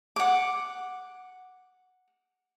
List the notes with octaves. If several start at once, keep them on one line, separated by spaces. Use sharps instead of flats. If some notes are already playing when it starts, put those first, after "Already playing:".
F#5 D6